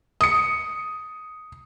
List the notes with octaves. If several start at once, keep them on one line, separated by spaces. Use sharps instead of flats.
D#6 C#7